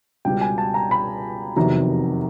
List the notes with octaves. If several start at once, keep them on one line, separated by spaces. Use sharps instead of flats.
C#2 B2 G3 G5
G#5
A5
A#5
B5
F1 E2 C3 D#3 F#3 A#5